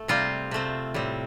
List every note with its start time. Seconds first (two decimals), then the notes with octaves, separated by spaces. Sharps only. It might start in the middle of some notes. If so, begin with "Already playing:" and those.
Already playing: A3
0.08 C3 G3 C4 F4
0.51 C3 A3 C4
0.94 A2 G3 C4